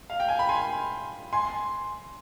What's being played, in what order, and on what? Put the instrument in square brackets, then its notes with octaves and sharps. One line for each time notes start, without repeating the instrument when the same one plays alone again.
[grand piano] F5
G5
G#5
B5
G#5 C6
G#5 C6